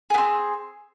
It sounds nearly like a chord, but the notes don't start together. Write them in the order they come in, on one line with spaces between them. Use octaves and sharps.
G#4 B3 C4